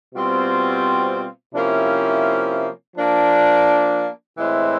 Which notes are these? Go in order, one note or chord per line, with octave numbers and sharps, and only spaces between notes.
B2 G3 C4 F4
C3 F3 A#3 C#4 E4
F3 A#3 D4
A2 E3 G#3 C4 E4